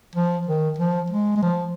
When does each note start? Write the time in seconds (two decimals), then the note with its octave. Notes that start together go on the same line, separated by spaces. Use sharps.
0.15 F3
0.47 D#3
0.78 F3
1.10 G#3
1.36 G#3
1.43 F3